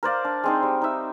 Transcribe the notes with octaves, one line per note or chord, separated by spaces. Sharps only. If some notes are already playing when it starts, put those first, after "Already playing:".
A#4 C5 D5 F5
D4
G#3 C4 D#4
G3
D#4 E5